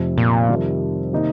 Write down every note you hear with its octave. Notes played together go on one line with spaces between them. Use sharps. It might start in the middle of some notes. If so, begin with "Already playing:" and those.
Already playing: F1 F2 C3
A#2
F2 C3 D#3 G3
C3 D#3 A#3 D#4